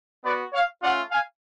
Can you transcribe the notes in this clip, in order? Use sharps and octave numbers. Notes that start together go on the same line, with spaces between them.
B3 F#4 B4 D5
C#5 F5
A3 C#4 F4 D5 F#5
F5 G#5